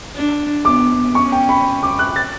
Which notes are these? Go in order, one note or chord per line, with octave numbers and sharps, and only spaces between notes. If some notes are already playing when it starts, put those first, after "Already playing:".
D4
B3 D6
C#4 C#6
G5
B5
D6
F#6
A6